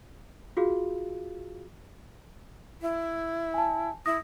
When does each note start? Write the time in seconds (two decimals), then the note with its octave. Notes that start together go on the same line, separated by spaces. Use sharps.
0.57 F4 F#4 G#4 F5
2.82 E4
3.54 G#5 A5
4.06 E4 D#6 A#6